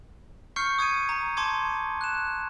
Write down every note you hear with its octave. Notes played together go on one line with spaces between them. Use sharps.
C#6 F6 G6 C7 C#7
D#6 G#6 C#7 D#7
A#5
A5 C6 D6 G#6
F#6 E7